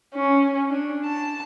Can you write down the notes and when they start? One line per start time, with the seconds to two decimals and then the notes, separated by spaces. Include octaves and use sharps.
0.14 C#4
0.70 D4
1.05 A5